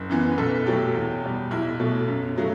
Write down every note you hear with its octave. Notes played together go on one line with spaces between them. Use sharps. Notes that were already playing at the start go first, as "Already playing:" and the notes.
Already playing: F#1
F#2 E3 B3
B4
B1 A4
B2 F#3 A3 G4
E2
B2 G3
B1 E4
B2 F#3 A3
F#2
C#3 F#3 A3